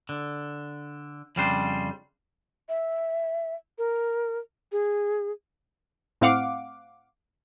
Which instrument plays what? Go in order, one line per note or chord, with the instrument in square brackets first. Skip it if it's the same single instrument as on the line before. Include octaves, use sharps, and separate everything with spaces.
[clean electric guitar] D3
F2 C#3 G3 D4 C5
[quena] E5
A#4
G#4
[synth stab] A2 C4 F5 F#5 D6